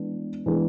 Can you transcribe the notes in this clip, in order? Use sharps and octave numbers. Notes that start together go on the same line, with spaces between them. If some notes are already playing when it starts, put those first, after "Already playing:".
Already playing: E3 G#3 B3 D4
E3 G#3 B3 D4 G#4